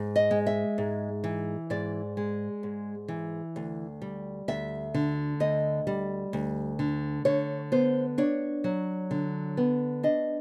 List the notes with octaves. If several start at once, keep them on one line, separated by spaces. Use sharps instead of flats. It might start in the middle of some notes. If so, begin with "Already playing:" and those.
Already playing: G#2
D#5
G#3
E5
G#2
E3
G#2 D5
G#3
G#2
E3
D2
G3
D2 E5
D3
D2 D#5
G3
D2
D3
D3 C#5
B3 C5
D4 C#5
F#3
D3
B3
D4 D#5